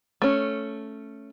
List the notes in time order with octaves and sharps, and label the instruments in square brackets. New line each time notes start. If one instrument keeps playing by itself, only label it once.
[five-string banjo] A3 C#4